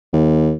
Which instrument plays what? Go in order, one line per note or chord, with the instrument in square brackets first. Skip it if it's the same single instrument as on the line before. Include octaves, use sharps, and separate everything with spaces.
[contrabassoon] D#2